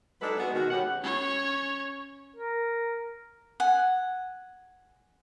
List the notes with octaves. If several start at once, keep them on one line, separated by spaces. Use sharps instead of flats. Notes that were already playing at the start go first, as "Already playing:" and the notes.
F#3 G#3 D4 D#4 A4 B4
G#3 B3 F#4
B2 D#3 F#4
G#3 B3 C#4 G4 F#5
C#4 C#5
A#4
F#5 G#5